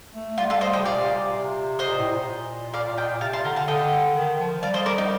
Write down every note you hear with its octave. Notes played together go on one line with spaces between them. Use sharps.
A3
G3 F4
F4 A4
C5 D#5
D#5 G5
C3
A#2 D5 F5
C3
A#2
C3
C3 C5 D#5
A#2
A2
A#2
D5 F5
D#5 G5
C3 F5 A5
A5 C6
D3 G5 A#5
F5 A5
D3 D#5 G5
D#3
F3
G3 D5 F5
C5 D#5
A#4 D5
D#4